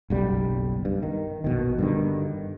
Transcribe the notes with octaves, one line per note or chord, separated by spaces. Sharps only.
F#1 B1 G3
G2
D#3
A#1 B2 D#3
G2 D3 D#3